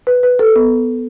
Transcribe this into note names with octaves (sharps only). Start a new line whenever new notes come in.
B4
B4
A4
B3